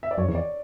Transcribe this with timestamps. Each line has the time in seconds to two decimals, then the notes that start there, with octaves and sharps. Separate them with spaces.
0.03 E5
0.11 D5
0.18 F#2 C#5
0.29 E2
0.35 D5